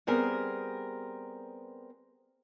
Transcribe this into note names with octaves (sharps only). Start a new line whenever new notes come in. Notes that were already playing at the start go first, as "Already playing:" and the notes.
G3 B3 C4 G#4 A#4